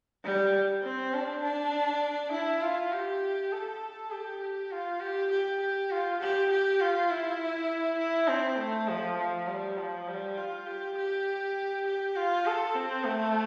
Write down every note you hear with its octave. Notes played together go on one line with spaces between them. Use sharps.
G3
C4
D4
D4
E4
F4
G4
A4
G4
G4
F4
G4
G4
G4
F4
G4
G4
F4
E4
E4
C4
A3
F3
F3
G3
F3
G3
F4
G4
G4
G4
F4
A4
C4
A3